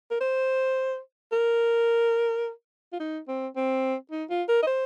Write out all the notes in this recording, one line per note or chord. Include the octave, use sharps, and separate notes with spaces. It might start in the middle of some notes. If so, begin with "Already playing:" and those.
A#4
C5
A#4
F4
D#4
C4
C4
D#4
F4
A#4
D#5
C5